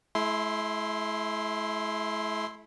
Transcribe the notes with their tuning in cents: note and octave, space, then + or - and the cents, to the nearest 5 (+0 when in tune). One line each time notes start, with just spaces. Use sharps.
A3 -45 E4 +0 C6 +0